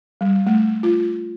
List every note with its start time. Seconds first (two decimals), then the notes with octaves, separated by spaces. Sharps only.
0.21 G3
0.47 A3
0.83 F4